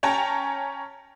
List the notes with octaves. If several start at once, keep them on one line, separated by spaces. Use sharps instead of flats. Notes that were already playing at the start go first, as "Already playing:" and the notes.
C#4 C#5 G5 A5 A#5